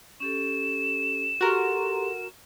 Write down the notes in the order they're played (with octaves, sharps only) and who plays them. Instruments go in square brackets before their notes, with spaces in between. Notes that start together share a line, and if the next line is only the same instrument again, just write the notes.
[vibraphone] C#4 G4 A4 [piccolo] E7
[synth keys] F#4 A#4 [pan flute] G4 [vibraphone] A4 A#5 C6